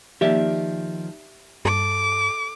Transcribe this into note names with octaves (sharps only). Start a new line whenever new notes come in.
D#3 F3 A#3 G4 D5 E5
G2 A4 D6